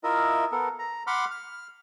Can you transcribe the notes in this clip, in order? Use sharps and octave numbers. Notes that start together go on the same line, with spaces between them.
E4 F4 A#4 D#5 E5
B3 A4 A#4
A#5
F#5 B5 C6 D6 F6
F6